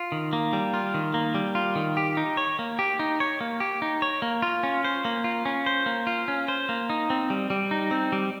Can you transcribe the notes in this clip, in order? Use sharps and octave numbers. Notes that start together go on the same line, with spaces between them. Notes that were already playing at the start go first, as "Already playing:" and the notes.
Already playing: F4
D#3
A#3
G3
F4
D#3
A#3
G3
F4
D#3
G4
D#4
C#5
A#3
G4
D#4
C#5
A#3
G4
D#4
C#5
A#3
F4
C#4
C5
A#3
F4
C#4
C5
A#3
F4
C#4
C5
A#3
D#4
C4
G3
G3
D#4
C4
G3